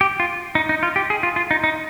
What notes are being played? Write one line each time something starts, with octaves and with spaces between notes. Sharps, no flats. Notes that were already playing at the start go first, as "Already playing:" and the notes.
G4
F4
D#4
D#4
F4
G4
G#4
F4
F4
D#4
D#4